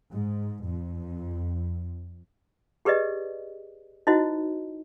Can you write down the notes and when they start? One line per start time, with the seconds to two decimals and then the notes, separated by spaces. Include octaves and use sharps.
0.12 G#2
0.65 F2
2.85 G4 G#4 B4 D5 D#5
4.07 D#4 E4 F#4 C5 D#5